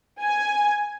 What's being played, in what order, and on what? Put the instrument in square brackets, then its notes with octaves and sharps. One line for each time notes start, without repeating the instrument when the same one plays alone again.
[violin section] G#5